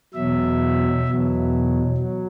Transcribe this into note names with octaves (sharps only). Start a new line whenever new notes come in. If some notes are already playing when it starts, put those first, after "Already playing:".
E2 B2 F#3 E5
E2 B2 F#3
F#3